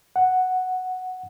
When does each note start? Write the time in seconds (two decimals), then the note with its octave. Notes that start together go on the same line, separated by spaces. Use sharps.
0.16 F#5